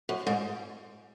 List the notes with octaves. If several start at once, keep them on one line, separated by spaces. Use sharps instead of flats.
F#2
G#2